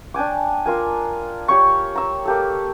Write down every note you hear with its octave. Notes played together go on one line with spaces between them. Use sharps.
D4 G5 G#5 D6
F4 A#4 G#5
G4 C#5 C#6
A#5 E6
A#3 G4 A4